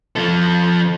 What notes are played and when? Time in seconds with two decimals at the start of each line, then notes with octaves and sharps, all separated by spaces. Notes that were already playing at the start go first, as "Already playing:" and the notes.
0.16 F3 A4